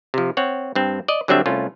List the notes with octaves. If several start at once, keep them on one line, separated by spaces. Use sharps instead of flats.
C3 F3
C4 C#5 F#5
G2 C4
D5 D#5
D3 F#3 G3 C4 D4 E5
C2 A3 C#4 F4